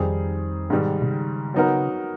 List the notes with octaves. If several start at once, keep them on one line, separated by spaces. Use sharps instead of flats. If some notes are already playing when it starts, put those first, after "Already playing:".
Already playing: F2 D#3 G3 C4 D#4 G#4
G#2 B2 D#3 G3
C3
C3
C#3
F#3 B3 D#4 F#4 A#4